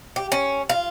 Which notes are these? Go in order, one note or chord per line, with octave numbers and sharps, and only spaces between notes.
G4
C#4
F4